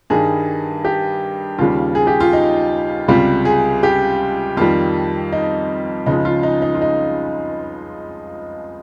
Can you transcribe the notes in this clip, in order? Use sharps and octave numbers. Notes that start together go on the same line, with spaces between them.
G2 D#3 G3 G#4
G4
D#2 C#3 G3 F4
G#4
G4
F4
D#4
C#2 C3 G3 F4
G#4
G4
F2 D#3 G3 F4
D#4
C#2 C#3 F3 G#3 D#4
F4
D#4
D#4
F4
D#4